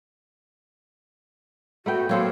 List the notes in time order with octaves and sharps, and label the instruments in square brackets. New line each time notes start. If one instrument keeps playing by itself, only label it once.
[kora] A3 B3 G5 [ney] F#4
[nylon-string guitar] F#3 A#3 [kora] C4 A4 C#5 [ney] F5